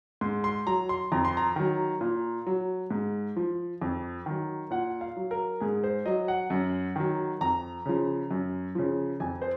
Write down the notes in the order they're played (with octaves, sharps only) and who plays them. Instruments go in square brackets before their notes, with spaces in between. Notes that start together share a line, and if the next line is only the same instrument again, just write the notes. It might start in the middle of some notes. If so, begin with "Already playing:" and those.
[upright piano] G#2 C6
C6
F#3 A#5
C6
F2 A#5
C6
A#5
D#3 F#3
A#2
F#3
G#2
F3
F2
D#3 F#3
A#2 F#5
F5
F#3
A#4
G#2 G#4
C5
F#3 D#5
F#5
F#2
D#3 F#3
F2 A#5
C#3 F3
F#2
C#3 F3
F2 G#5
C5